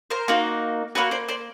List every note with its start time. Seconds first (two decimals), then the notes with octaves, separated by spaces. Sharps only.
0.10 A#4 C5
0.28 A#3 D#4 F#4
0.95 A#3 D#4 F#4 B4 C#5
1.11 C5 D5
1.29 C5 D5